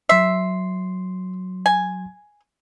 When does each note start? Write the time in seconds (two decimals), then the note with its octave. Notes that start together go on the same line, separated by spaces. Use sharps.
0.09 F#3 E5 C6 C7
1.66 G#5